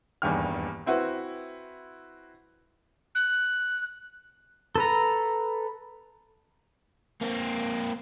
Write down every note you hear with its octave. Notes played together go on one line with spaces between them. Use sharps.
D#1 E2 G2 D#3 F6
C4 E4 F#4 B4
F#6
A4 B4 A#5
A#3 C4